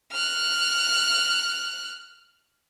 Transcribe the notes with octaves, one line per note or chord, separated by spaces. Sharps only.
F6 F#6